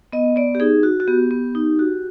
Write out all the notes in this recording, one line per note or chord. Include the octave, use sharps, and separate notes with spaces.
B3 D#5
B3 D5
G4
D#4 G#4
F#4
F#4
B3 G4
B3
D#4
F#4